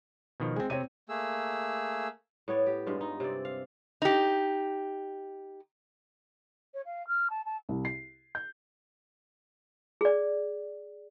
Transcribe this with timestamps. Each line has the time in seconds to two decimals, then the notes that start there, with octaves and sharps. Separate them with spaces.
0.40 B2 D#3 F3
0.56 G#3 C4
0.70 C3 C4 C#5 D#7
1.09 A3 A#3 G#4 E6
2.48 A2 B3 C#5 D5
2.66 G4
2.86 G2 G#3 F4
3.01 D#4
3.20 C3 C4 D5
3.45 F5
4.02 D#4 G4
6.74 C#5
6.85 F5
7.07 F6
7.30 A5
7.45 A5
7.69 C2
7.85 C7
8.35 G6
10.01 G#4 D5